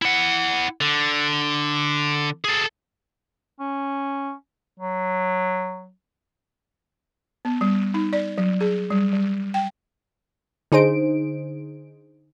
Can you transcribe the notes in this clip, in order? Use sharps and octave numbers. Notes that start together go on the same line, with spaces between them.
E4 F#5
D3
G#4 A4
C#4
F#3
B3
G3
D#4
D5
F#3
G#4
G3
G3
G5
D3 D#4 G#4 C5 D7